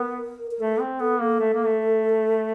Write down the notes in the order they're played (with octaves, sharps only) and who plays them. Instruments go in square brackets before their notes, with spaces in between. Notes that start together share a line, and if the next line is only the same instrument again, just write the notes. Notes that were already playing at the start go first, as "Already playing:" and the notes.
Already playing: [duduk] B3 [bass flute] A#4
[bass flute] A#4
[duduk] A3 [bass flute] A4
[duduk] C4
[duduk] B3 [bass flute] A4
[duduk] A#3 [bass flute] A4
[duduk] A3
A#3
A3